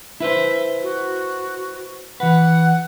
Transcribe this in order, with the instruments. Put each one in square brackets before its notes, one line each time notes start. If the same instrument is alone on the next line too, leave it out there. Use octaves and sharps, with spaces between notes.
[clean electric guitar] E4 B4 C5 [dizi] E5
[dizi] F#4
[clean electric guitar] E3 B4 [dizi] F#5